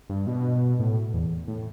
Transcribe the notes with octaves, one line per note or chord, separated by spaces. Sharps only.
G2
B2
A2
E2
A2